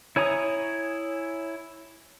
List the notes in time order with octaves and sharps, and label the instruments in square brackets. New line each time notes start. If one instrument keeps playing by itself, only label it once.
[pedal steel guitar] E4 C#5 G#5 A#5 D#6